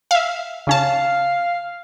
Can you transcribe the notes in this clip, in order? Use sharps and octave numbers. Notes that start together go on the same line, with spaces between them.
E5 F5
C#3 C#4 F5 A5